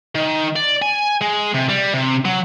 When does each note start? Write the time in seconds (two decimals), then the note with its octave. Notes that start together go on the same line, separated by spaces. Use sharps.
0.15 D#3
0.56 D5
0.82 G#5
1.21 G#3
1.55 C3
1.69 G3
1.93 C3
2.25 F#3